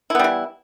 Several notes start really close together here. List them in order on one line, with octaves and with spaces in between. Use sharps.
E4 B3 G3 E3